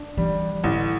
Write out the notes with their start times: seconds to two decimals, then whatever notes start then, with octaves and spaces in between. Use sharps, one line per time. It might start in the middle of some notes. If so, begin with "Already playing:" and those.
Already playing: D4
0.17 E3 G3
0.64 A1 D3